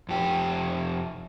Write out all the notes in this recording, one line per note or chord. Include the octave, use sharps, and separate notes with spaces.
F2 G4